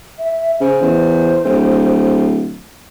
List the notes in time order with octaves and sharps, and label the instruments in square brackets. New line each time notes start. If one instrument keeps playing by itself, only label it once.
[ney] E5
[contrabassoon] C#3 [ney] C5
[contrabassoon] E2
D1